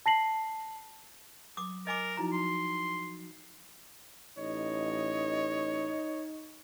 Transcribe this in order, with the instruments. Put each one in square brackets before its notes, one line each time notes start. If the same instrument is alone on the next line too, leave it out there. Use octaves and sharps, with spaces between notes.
[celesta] A5 A#6 C7 F#7
[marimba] F#3 [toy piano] D6 D#6
[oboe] A#4 [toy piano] D#5 G#5 D6
[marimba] F3 D#4 F#4 [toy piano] E4 A#5
[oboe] C6
[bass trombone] A1 [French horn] D#4 [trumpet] C#5 [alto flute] D#5